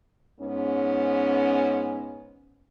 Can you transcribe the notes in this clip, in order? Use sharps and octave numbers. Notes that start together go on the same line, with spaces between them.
G#2 B3 C#4